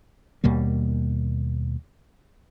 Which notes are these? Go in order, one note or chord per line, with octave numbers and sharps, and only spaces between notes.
D#2 B2 G3 A#3